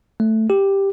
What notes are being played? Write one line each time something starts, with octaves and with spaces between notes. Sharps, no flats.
A3
G4